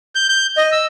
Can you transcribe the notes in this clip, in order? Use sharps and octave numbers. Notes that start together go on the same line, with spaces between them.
G6
G6
D#5
E6